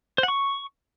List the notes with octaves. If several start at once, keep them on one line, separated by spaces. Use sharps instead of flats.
C5
F#5
C#6